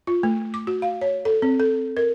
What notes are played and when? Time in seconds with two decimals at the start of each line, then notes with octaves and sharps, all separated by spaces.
0.07 F4
0.23 A3
0.54 D6
0.67 F#4
0.82 F5
1.01 C#5
1.25 A4
1.42 C4
1.60 A4
1.97 A#4